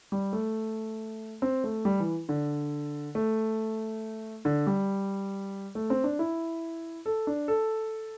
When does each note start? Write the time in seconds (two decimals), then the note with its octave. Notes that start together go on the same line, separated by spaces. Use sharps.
0.12 G3
0.33 A3
1.42 C4
1.64 A3
1.85 G3
2.00 E3
2.29 D3
3.15 A3
4.45 D3
4.67 G3
5.75 A3
5.90 C4
6.04 D4
6.19 E4
7.06 A4
7.27 D4
7.48 A4